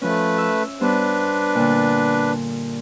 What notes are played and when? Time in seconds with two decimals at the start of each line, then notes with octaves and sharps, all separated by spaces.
0.02 F3 A3 C#4 B4
0.38 E5
0.81 G2 B3 D4 B4 C5
1.55 A#2 D3